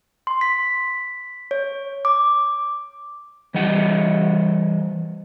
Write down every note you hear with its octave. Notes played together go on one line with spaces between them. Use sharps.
C6
B6
C#5
D6
E3 G3 D#5 F#5